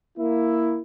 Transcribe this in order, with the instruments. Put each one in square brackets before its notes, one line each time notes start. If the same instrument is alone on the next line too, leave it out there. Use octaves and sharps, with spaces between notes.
[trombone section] A#3 E4